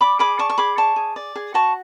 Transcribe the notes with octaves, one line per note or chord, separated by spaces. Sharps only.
D5 B5 D6
G#4 B5 D6
D5 A5 C#6
C#6
G#4 B5 D6
D5 A5 C#6
G#4
D5
G#4
F#4 A5 C#6